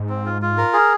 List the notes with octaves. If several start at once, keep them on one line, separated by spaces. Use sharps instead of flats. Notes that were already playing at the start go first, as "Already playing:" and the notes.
Already playing: G#2
C4
F4
F4
A#4
G#4